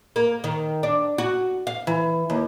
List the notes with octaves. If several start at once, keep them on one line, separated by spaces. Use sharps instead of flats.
A#3
D#3
D4
F#4
F5
E3
D#2